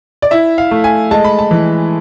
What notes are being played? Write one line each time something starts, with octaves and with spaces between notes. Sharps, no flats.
D5
E4 E5
F5
A3
G#5
G#3 A5
B5
A5
E3